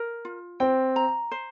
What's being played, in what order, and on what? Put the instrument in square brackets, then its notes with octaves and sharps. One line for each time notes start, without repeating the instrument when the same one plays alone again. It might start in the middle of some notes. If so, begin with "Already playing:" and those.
Already playing: [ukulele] A#4
F4
[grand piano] C4 [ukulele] G5
[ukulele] A#5
C5